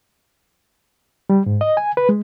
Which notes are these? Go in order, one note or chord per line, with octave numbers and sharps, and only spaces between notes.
G3
G#2
D#5
G#5
B4
G#3